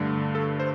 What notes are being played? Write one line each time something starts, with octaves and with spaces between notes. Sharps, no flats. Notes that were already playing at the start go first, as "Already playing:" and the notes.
Already playing: G2 D3 A3
A4
C5